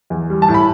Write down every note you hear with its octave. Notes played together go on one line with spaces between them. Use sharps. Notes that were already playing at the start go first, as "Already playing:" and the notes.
E2
G3
A5
A2
B5